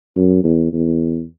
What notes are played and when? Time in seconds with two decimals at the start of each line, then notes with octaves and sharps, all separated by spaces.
0.16 F#2
0.44 E2
0.73 E2